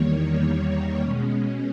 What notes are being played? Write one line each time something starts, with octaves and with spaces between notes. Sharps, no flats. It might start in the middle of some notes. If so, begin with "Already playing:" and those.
Already playing: E2 D#3 G3 A#3 C#5
B2 G#3 C#4